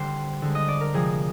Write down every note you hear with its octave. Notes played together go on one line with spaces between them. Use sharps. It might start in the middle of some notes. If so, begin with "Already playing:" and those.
Already playing: D3 G3 C5
D3 G#3
D#5
D5
A#4
C3 F3 G#3 G#4